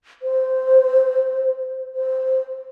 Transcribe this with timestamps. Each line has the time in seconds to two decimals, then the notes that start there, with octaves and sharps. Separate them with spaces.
0.22 C5
1.95 C5